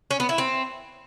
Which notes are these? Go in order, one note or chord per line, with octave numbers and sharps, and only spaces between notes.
C#4
B3
E4
C4